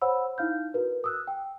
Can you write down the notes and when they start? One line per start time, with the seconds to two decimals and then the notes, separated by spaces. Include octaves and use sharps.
0.02 C5 C#5 F#5 B5 E6
0.38 D#4 E4 F5 F6 G6
0.74 F#4 A#4 B4
1.04 D#6 E6 F#6
1.27 G5